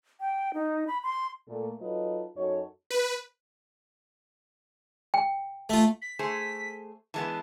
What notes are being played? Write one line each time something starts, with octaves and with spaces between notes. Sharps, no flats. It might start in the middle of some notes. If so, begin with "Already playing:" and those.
G5
D#4
B5
C6
A#2 A3 A4
F#3 D#4 F4 A4 B4 D#5
F#2 D#4 F#4 A4 C#5
B4
G5
A3 F4
B6
A3 G#4 C5
E3 G#3 B3 A5